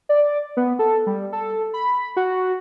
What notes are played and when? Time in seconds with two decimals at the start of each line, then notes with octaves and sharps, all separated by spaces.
0.09 D5
0.57 B3
0.79 A4
1.07 G3
1.32 A4
1.74 B5
2.17 F#4